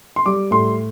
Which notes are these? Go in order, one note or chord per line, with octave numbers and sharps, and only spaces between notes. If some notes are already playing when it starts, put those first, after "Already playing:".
C6
G3 D6
A2 C6